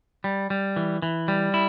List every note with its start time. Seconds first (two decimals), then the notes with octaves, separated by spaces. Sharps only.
0.24 G3
0.50 G3
0.76 E3
1.02 E3
1.28 G3
1.54 E4